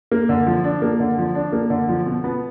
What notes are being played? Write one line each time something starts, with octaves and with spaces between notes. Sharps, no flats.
A#3
D3
F3
D4
A#3
D3
F3
D4
A#3
D3
F3
B2
B3